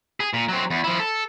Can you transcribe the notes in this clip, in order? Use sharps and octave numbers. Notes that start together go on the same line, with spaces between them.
G#4
A#2
F#3 C4
E2
F3 E4
A4